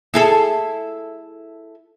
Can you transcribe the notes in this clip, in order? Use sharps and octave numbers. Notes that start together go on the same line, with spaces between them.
E4 G#4 A4